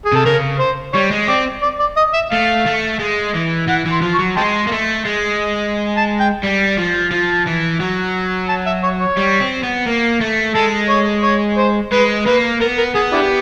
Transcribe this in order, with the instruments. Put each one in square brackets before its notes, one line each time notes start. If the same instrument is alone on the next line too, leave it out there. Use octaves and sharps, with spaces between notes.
[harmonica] G#4
[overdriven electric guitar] C3 [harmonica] A4
[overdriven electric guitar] C#3 [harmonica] A#4
[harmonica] C5
[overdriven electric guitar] G3 [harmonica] C#5
[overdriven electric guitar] G#3
[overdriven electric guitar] C4 [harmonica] D5
[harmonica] D5
D5
D#5
E5
[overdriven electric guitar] A3 [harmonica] F5
[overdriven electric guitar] A3
G#3
E3
[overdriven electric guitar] E3 [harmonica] F#5
[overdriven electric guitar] E3
[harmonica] C6
[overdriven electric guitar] F3
[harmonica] C#6
[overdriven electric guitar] F#3
[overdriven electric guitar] G#3 [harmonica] G5 A5 C6
[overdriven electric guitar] A#3
A3
G#3
[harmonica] A5
G5
[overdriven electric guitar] G3
F3
F3
E3
F#3
[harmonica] A5
E5
C#5
C#5
[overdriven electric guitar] G3
C4
B3
A#3
A3
[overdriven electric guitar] G#3 [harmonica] A4
[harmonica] C#5
C#5
C5
[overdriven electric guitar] G#3 [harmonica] B4
[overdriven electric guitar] A#3 [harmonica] B4
[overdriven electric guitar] B3 [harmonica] A#4
[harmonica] A#4
[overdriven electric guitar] B3 [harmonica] G#4
[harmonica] D4 E4 G4